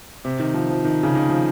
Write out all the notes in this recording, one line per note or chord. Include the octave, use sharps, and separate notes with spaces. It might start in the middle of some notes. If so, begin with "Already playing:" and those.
C3
D#3
F3
F3
D#3
C#3
D#3
F3